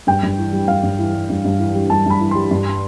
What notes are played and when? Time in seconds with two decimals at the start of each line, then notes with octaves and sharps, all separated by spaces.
0.07 G2 G5
0.23 G2
0.38 E3
0.53 G3
0.68 G2 F5
0.83 G2
0.99 E3
1.14 G3
1.30 G2
1.45 G2
1.59 E3
1.74 G3
1.90 G2 A5
2.06 G2 B5
2.20 E3
2.31 G3 C6
2.51 G2